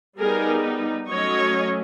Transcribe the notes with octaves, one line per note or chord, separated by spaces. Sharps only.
G3 B3 D#4 G#4 A#4
F#3 A3 C#4 C#5 D#5